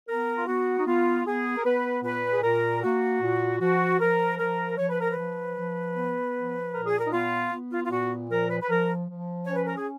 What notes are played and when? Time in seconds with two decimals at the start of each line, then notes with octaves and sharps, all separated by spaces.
0.08 B3 A#4
0.38 F4
0.47 B3 F#4
0.79 D#4
0.87 B3 F4
1.26 B3 G#4
1.57 A#4
1.64 B3 B4
2.04 A#2 B4
2.31 G#4
2.43 A#2 A#4
2.82 A#3 F#4
3.21 A#2
3.60 F3 F#4
4.00 F3 A#4
4.39 F3 A#4
4.78 F3 C#5
4.89 B4
5.01 A#4
5.12 B4
5.17 F3
5.56 F3
5.95 B3
6.35 F3
6.74 A#2 A#4
6.86 G#4
6.99 A#4
7.07 D#4
7.13 B3 F4
7.52 B3
7.72 F4
7.84 F4
7.91 A#2 F#4
8.30 F3 A#4
8.50 B4
8.61 B4
8.70 F3 A#4
9.09 F3
9.45 C#4 C#5
9.55 B4
9.66 A#4
9.76 G#4